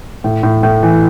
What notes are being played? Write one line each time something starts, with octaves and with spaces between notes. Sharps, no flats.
A2
A2
A2
E3